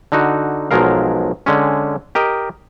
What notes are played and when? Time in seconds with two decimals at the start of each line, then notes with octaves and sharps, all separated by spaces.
0.12 D3 D#4 F#4
0.71 B1 F3 F#3 G#3 A#4 F5
1.46 D3 G#3 C#4
2.15 G4 A#4 D#5